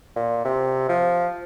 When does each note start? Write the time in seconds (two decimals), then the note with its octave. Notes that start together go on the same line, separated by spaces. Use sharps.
0.16 A#2
0.45 C3
0.89 F3